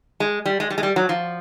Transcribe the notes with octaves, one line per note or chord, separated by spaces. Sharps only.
G#3
G3
G#3
G3
G#3
G3
F#3
F3